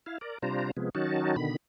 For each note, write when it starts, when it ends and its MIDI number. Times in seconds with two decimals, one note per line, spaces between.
0.06 0.18 64
0.06 0.18 77
0.21 0.38 70
0.21 0.38 74
0.42 0.71 48
0.42 0.71 55
0.42 0.71 62
0.42 0.71 65
0.42 0.71 72
0.42 0.71 82
0.77 0.90 48
0.77 0.90 53
0.77 0.90 56
0.77 0.90 59
0.95 1.36 51
0.95 1.36 54
0.95 1.36 61
0.95 1.36 63
0.95 1.36 66
0.95 1.36 81
1.36 1.56 47
1.36 1.56 50
1.36 1.56 51
1.36 1.56 83